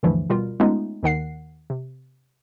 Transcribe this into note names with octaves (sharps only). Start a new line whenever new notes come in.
D2 G2 D3 E3 F3 A3
B2 G3 F4 A#4
G#3 A3 B3 C#4 D#4 F4
D#2 D#3 F#5 C7
C3